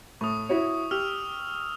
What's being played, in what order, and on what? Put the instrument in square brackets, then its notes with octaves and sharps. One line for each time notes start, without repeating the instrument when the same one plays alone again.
[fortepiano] A2 [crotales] C#6 D#6
[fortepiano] E4 F#4 C#5
[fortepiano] G4 [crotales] E6 F6 F7